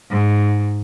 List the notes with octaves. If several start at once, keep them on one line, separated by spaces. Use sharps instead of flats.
G#2